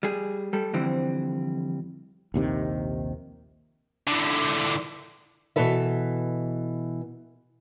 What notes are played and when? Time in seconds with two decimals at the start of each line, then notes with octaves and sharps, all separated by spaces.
0.03 G3 G#4
0.53 G3 A4
0.74 F2 D3 E3 G3 C4
2.34 A#1 D#2 C3 D#3
4.07 D3 E3
5.56 B2 E3 A4 B4 E5